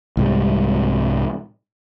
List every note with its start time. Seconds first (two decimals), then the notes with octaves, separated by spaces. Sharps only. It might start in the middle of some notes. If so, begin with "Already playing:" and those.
0.17 C2 G#2 G3